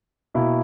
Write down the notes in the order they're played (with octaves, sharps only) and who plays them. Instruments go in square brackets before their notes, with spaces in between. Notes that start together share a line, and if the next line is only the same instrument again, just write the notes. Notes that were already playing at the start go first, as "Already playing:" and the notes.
[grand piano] B2 A#3 E4